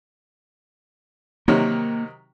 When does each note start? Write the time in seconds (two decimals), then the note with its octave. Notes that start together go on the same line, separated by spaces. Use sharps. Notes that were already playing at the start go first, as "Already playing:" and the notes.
1.48 C3 D#3 F#3 A#3